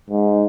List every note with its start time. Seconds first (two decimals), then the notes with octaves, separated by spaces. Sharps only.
0.10 G#2